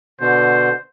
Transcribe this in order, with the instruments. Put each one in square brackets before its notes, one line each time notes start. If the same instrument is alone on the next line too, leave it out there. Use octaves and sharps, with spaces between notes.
[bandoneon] B2 D3 [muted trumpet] C5